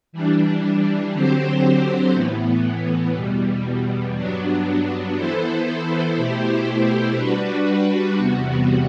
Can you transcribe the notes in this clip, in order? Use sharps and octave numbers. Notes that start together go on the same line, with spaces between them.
E3 G3 D4
D3 F#3 C4 G4 C5
A2 E3 B3
E2 B2 G3
G2 F#3 B3 D4
E3 B3 E4 A4 C5
B2 A3 E4 G4 C5
G3 D4 F#4 B4
E2 C3 G3 B3 F#4